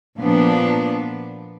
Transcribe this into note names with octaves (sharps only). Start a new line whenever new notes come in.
A#2 F3 B3 D4